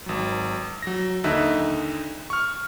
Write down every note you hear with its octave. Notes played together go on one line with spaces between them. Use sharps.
G#1 F#3
F#3 A#6
D#2 D3 D#4 E5 F#6
C#6 F6